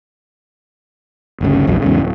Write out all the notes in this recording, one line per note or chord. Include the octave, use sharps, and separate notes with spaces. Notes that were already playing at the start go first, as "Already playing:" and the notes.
G1 D2 C#3
A#1 E2 G#2 F#3
E2 G#2 C#3
D1